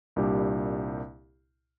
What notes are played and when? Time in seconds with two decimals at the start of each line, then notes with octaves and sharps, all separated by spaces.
0.16 C2 A#2 G3 D4 G4